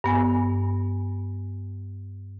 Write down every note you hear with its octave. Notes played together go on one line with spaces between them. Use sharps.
G2 B3 G#5